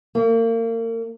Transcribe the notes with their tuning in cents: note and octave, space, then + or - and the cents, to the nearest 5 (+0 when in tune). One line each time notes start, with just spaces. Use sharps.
A#3 -35